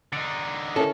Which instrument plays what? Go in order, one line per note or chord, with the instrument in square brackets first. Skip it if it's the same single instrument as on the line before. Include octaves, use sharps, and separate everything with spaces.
[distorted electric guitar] D3 D#4 [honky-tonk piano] A6 C#7 D7
[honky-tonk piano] C#4 E4 A#4 [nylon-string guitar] A4